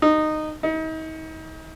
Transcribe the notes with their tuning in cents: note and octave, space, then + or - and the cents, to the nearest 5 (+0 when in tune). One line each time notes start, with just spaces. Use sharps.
D#4 -15
D#4 +35